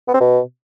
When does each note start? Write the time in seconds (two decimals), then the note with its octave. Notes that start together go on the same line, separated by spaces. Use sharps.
0.08 B3
0.14 C4
0.20 B2